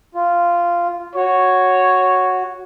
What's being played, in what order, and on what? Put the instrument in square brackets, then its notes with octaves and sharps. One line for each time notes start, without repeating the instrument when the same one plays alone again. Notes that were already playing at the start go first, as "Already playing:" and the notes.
[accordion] F4
[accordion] F#4 [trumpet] C#5